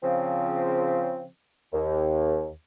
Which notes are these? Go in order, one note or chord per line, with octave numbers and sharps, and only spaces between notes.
C#3 F3 C4
D#2